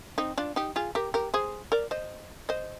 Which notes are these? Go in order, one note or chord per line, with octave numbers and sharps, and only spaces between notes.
C4 D#4
D4 F4
D#4 G4
F4 G#4
G4 A#4
G4 A#4
G#4 C5
A#4 D5
C5 D#5
C5 D#5